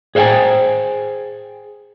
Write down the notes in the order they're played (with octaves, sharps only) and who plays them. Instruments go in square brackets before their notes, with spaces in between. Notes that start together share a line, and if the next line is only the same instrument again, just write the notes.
[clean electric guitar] G#4 C5 D#5 E5 G5 G#5